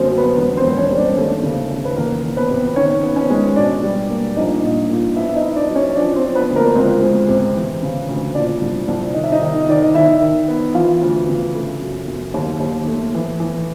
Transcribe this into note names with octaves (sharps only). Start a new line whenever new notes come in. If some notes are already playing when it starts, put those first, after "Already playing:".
Already playing: G1 F#2 A#3 C4 A#4 C5
F#3
B3 B4
E1 B3 B4
C4 C5
E1
C#4 C#5
G3
D4 D5
D#2 A3 A4
C#3
D#2
B4
E2 A#3 A#4
E2
B3 B4
C3
D#3 C#4 C#5
B3
C#4 C#5
G#3
B2 D4 D5
G3
A#3
A#1 D#4 D#5
A#2
A#2
B3 E4 E5
E5
D#4 D#5
E4
D4 D5
F#3
C#4 C#5
F3 D4 D5
C4 C5
F3
B3 B4
D2
A#3 A#4
C#2 C4 C5
G#3
C3
E3
C#3
D2
A#2 D4 D5
C2
C2
D#3 D#5
E5
D#4 D#5
D#3
D#3 D5
D#5
D#3 E4 E5
D#3
B3
E3 F4 F5
D2
C#3
A3
F#2
F#2
D#2
D#2
A3
E3
E3